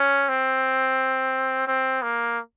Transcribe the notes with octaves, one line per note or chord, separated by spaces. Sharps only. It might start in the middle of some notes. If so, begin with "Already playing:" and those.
Already playing: C#4
C4
C4
A#3